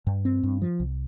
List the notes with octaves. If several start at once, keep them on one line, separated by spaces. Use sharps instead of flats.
G2
C4
G2
F3
C2